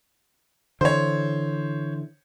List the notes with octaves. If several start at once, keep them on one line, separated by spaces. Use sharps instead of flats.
D3 E3 C5 C#5